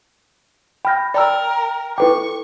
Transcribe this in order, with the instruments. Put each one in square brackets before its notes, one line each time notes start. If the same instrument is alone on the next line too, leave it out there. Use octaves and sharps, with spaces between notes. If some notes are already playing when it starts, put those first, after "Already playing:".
[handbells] G5 F6 G6 [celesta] B5 A#6
[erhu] A#4 [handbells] D5 A#5 E6 [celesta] G5
[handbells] E4 B4 G5 [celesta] A4 D6 [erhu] C#6